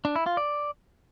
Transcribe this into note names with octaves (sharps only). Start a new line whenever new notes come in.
D4
E4
F4
D5